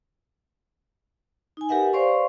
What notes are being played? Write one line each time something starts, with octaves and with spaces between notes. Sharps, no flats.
D#4 G#5
G4 A#4 B4 E5 F#5
B4 C5 D5 F5 C6 C#6